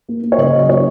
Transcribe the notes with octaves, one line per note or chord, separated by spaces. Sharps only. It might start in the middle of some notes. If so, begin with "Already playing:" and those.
A#3
A#3
C#5
C#3 D#5
F#3
A#3 C#5